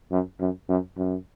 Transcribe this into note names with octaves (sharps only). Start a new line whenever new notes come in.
F#2
F#2
F#2
F#2